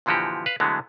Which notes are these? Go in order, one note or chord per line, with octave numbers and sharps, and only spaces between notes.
A#2 D3 E3 F3 F#4 G4
B4 F5
D3 E3 F#3 G#3 A3 B3